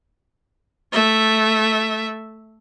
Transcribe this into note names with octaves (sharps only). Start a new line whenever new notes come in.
A3 E5